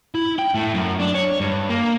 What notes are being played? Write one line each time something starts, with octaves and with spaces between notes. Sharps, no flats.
E4
G5
A2
F#2
D4
C#5
G2
A#3